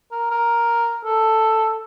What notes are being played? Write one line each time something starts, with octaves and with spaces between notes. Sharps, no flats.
A#4
A#4
A4